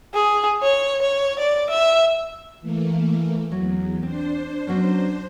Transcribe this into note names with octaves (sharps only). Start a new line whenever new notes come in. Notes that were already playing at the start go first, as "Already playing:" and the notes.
G#4
C#5
C#5
D5
E5
E3 A3 A#3
E2 F#3
C4 D4 C5
F#3 B3 C#4